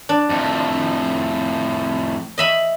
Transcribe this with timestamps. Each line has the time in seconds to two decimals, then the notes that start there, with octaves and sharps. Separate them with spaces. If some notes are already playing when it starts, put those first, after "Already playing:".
0.09 D4
0.29 F2 A2
2.38 D#5 E5 B5